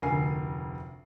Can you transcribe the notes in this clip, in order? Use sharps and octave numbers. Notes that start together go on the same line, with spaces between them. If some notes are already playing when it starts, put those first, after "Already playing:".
F1 D2 A#4 G#5 C7